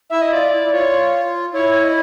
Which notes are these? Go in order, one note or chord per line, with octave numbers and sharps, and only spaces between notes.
E4 E5
D#5
F4 D5
E4
F4 C#5
E4 C#5
D#5